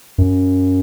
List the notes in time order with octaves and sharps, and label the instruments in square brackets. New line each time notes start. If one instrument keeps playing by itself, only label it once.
[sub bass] F#2